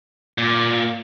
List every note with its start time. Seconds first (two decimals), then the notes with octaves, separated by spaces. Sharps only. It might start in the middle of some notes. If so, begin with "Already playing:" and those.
0.38 A#2